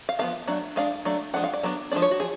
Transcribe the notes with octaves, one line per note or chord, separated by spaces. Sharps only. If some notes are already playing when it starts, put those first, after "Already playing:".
F5
F3 B3 D4 F5
F#3 A3 D4
G#3 D4 F5
F#3 A3 D4
F3 G#3 D4 F#5
F5
D5
F#3 B3 D4
F3 G#3 D4 D5
C#5
F#4
F3 G#4